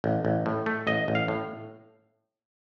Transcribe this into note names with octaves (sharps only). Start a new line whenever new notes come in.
A1
A1
A2
A3
A1 D#5
A1
F5
A2